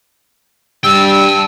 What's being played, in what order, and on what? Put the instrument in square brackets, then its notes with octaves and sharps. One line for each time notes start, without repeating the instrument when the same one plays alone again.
[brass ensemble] G2 G3 [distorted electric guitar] G5 A5 [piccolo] E6